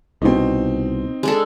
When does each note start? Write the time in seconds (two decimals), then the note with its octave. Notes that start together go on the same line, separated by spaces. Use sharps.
0.22 C2 B2 C4 D#4
1.23 G#3 D4 A4